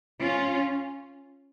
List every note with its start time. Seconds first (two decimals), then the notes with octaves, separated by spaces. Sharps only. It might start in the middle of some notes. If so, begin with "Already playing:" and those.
0.20 C#4 F4